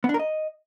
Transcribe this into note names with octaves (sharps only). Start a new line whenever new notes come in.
B3
D4
A#4
D#5